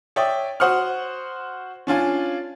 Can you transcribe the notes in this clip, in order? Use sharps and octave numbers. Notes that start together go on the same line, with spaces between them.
C#5 D5 E5 G5 D#6
F#4 C5 F#5 C#6 D#6 F6
C#4 D4 F4 G#5